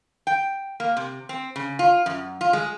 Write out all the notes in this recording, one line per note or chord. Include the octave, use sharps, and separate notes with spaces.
G5
A#3
C3
C4
C#3
F4
F#2
F4
G#3